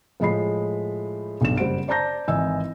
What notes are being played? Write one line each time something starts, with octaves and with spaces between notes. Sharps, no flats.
A2 F3 G#3 D#5 B5 C7
B1 G2 E7
F#1 G3 C5 F#5 D7
C5 D5 A5 A#5 G6 A#6
G#1 E3 D#5 G#5 E6